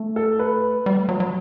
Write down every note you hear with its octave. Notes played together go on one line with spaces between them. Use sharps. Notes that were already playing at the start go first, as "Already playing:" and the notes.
Already playing: A3
A4
B4
G3
A3
F#3
F#3